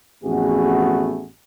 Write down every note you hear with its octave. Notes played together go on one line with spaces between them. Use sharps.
A1 F2 A3 B3 F#4 G#4